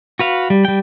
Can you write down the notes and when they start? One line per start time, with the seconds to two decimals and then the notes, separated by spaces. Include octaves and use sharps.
0.19 F#4 B4 F5
0.50 G3
0.65 G3 G5